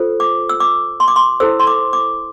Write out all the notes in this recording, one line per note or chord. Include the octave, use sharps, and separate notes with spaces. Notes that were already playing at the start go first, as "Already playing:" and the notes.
Already playing: F4 A4 C5
D6
E6
D6
C6
D6
C6
E4 A4 C5 E6
C6
D6
D6